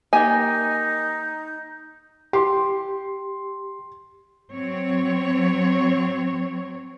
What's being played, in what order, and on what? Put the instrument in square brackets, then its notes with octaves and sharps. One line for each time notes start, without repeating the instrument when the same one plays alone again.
[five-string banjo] A#3 G4 G#5 [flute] D#4
[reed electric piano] G4 [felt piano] C6
[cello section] F#3 C4 C#5